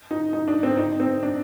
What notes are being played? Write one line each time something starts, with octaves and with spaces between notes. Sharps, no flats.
D#4
D#4
D4
C4
D#4
C4
D4